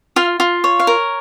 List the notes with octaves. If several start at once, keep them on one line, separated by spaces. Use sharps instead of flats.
F4 F5
F4
C#5
F5
A#4